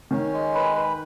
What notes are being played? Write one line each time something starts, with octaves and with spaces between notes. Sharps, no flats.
D#3 C#4
G#3
B4
B4